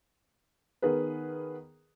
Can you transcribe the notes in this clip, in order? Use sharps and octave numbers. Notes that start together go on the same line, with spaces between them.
D#3 B3 G#4 A#4 B4